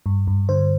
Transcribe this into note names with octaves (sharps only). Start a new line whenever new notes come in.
G2
G2
D3 C5